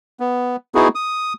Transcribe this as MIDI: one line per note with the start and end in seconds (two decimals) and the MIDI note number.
0.20 0.56 59
0.75 0.88 59
0.75 0.88 63
0.75 0.88 64
0.75 0.88 66
0.75 0.88 68
0.95 1.33 87